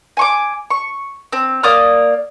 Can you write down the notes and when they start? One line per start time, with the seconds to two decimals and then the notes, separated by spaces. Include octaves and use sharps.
0.17 G#5 C#6 D6
0.70 C#6
1.33 C4
1.63 A#3 D5 D#6 F6